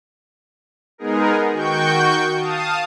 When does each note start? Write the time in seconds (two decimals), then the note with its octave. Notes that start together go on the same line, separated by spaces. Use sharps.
0.98 G#3 B3 D#4 G#4 A#4
1.52 D#3 F#4 G5 C#6 G6
2.38 F5 A5 D#6